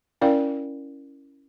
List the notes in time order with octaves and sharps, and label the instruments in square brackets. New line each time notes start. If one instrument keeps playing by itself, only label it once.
[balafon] C#4 E4 A#4 D5 F5 G5